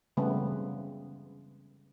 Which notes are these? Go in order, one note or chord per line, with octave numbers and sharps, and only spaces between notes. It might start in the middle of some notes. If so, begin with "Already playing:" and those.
C#3 E3 G3 A3 B3 C4